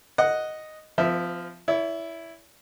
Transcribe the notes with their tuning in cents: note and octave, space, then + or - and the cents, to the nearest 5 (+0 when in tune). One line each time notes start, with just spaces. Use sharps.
D#5 +0 F#5 +0
F3 +0 C4 -40 E5 -5
E4 +0 C#5 +40